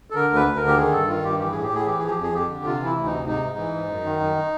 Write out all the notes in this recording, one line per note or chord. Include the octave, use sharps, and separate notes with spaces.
A4
D3 A#4
D2
B4
D2
A#4
D3
G4
D#3 G#4
G2 A4
D#3 F4
G2 G4
E3 G4
A2 G#4
G4
A2 G#4
E3 G4
F3 G#4
G4
F2
G#4
F2 G4
D3
C3 F4
E3
E4
D2
C3 D#4
G#2 D#4
G#2
E3
G#2
F#2
D#3
F#2